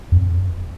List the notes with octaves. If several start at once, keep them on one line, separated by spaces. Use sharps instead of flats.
F2